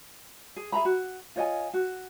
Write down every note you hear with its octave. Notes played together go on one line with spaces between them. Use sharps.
G#4
G#4 E5 A#5 B5
F#4
F4 C#5 D#5 G#5
F#4